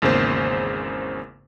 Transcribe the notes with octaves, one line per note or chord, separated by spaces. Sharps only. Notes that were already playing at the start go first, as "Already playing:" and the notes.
G#1 E2 C#3 A#3 C5